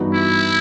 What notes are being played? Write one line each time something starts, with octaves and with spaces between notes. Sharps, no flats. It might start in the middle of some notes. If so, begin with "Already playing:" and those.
Already playing: G2 E3 B3 D#4 F#4
E4